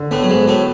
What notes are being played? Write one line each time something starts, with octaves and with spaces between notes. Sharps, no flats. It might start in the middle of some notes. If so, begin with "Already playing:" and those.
Already playing: D3
A2 A3 B3
F#3
G#2 G#3
F#3
A2 A3